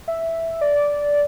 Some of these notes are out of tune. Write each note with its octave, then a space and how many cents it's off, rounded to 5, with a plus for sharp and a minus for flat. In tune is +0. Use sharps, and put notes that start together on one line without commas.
E5 +0
D5 -10